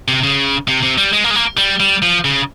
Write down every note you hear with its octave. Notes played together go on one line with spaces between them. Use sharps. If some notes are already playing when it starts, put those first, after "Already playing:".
C3
C#3
C3
C3
G3
G#3
A#3
G#3
A#3
G3
G3
F3
C#3